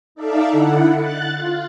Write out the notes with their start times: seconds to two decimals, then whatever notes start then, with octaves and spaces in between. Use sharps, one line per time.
0.15 D#4 A4 D5 E5 F5
0.50 D3 E4 F#5
0.93 F#6 A6
1.34 F4